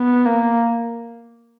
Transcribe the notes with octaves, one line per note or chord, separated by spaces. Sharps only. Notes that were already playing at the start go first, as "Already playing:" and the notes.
Already playing: B3
A#3